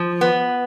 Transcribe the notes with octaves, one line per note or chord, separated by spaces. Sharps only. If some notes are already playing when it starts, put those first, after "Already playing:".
Already playing: F3
B3